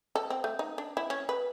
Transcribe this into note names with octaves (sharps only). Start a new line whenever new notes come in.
A4
C4
A3
D#4
D4
E4
C#4
B4